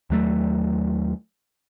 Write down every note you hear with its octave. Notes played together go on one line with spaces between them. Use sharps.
D#2 F#3 A3